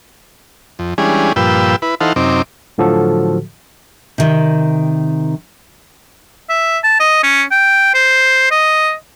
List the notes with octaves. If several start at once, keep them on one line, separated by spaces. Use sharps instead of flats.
F2
E3 G3 G#3 C#4 D4 G#4
G2 A#2 F3 B4 G5 E6
E4 B4
E3 D#4 A4 C5 F5 F#5
F#2 C3 C4 D#4 D6
A2 D3 F3 F#3 F#4 A4
C3 D#3
E5
A5
D#5
C#4
G5
C5
D#5